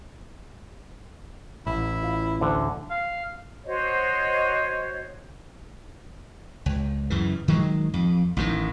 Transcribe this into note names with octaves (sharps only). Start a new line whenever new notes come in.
A1 E4
F4 F5
D2 D3
F5
F#4 C5 C#5 D#5
C#2
F#2 C#3 E3
D#3 F#3 G#3
F2
A1 A2 D#3